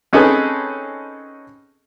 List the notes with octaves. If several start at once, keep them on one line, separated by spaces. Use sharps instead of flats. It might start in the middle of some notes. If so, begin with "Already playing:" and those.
C4 C#4 D#4 G#4 A4 B4